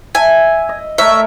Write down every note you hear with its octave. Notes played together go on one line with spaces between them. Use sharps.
E5 G#5
D#5
A3 A#4 C#5 E5